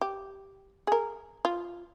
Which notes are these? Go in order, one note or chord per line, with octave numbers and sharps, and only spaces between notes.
G4
G#4 A#4
F4